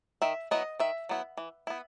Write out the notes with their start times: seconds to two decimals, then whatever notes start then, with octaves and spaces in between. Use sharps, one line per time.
0.22 D#3 E5
0.51 F#3 B3 E4 D#5
0.79 D#3 E5
1.09 F#3 B3 E4
1.37 E3
1.67 B3 E4